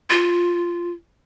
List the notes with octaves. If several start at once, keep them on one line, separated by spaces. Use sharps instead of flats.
F4